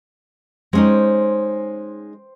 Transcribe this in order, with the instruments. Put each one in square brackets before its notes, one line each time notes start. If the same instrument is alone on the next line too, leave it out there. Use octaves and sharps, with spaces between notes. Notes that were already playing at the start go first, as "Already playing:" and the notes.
[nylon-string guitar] G#3 C#4 D#4 [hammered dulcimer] C5 G5